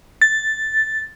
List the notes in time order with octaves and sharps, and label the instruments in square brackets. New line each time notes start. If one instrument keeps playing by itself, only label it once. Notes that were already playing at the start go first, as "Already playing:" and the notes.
[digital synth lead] A6